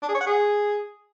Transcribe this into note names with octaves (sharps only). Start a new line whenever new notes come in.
D4
G#4
C#5
F#5
G#4